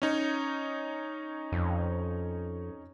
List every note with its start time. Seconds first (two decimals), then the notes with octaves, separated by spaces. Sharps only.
0.02 C#4 D#4 C#5
1.52 F2